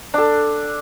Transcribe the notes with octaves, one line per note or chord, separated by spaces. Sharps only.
D4 A4